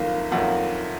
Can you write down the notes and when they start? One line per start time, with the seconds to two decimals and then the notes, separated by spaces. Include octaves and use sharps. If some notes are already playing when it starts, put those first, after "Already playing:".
Already playing: F#1 F2 D#3 A#3 F5
0.31 F#1 F2 D#3 A#3 F#5